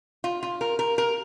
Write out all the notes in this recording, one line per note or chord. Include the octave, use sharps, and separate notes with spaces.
F4
F4
A#4
A#4
A#4